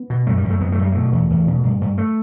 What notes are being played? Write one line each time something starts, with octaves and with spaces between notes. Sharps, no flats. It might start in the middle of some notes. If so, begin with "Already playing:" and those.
Already playing: B3
B2
F#2 A3
G3
F#2
A3
F#2 B3
A3
F#2 G3
B2 A3
E2
E2
B2
G2
G2
A3